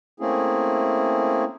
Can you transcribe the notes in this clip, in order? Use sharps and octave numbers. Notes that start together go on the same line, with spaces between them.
A3 A#3 C4 C#4 E4 G#4